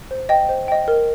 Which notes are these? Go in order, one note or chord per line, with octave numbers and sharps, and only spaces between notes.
C5
D#5 G5
C5
D#5 G5
A#4